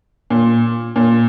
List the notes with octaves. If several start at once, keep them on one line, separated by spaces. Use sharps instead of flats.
A#2
A#2